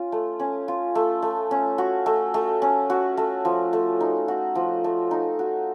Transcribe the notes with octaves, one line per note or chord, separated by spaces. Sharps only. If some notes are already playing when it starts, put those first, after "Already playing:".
Already playing: C#4 F4
A3
C#4
F4
A3
A3
C#4
F#4
A3
A3
C#4
F#4
A3
F3
A3
D#4
F#4
F3
A3
D#4
F#4